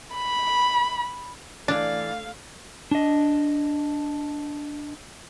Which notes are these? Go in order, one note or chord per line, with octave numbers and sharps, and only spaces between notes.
B5
E3 A3 D4 D5 F5
D4 D#5